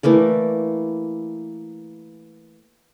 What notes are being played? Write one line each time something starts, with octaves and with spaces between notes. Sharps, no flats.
E3 A3 A#3 D5